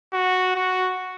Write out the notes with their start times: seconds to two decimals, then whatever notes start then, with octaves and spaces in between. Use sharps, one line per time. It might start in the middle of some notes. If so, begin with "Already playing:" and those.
0.13 F#4
0.56 F#4